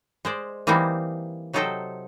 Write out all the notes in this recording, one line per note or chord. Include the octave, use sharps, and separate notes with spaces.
G#3 C5 D5
E3 G3 A#3 C4 D#4 E4
C3 F#3 D#4 A4 C5 G5